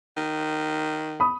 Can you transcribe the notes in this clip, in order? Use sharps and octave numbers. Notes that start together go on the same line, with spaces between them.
D#3
B5 D#6